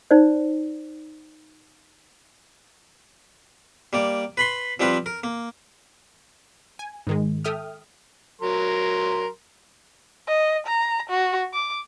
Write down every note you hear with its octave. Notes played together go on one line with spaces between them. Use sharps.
D#4 C5 D5
G3 A#3 D5
B4 B5 C6
F3 G3 C4 F4 B4
A#4
A#3
G#5
G#2 D#3 G#3
A4 E5 G5 D#6 F6
F#3 A#4 C6
D#5
A#5
F#4
D6